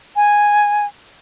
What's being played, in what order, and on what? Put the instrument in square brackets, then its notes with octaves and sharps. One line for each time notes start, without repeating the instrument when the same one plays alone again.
[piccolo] G#5